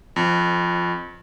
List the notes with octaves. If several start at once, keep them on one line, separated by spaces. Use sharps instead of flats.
F2